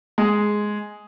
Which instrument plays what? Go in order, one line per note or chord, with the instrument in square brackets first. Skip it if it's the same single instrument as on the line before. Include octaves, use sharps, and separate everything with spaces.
[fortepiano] G#3